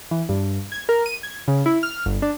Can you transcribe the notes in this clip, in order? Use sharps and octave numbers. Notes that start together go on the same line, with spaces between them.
E3
G2
G#6
A#4
D#7
G#6
C#3
E4
F6
G1
D4